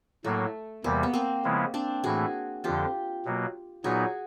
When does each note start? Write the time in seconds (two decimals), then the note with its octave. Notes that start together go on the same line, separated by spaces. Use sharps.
0.24 A2 F#3 A3 A#3
0.84 E2 C3 E3 G3 A#3
1.03 B3
1.13 A#3 C4
1.44 C#3 F3 G#3 B3 E4
1.74 C4 D4
2.04 A2 E3 A3 F#4 G#4
2.64 F2 D3 F3 F4 G4
3.25 B2 F#3 A#3
3.84 A#2 F#3 B3 D#4 F#4 G#4